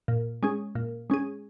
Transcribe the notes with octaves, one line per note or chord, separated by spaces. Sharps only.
A#2
G#3 C#4 G#4
A#2
G#3 C#4 G#4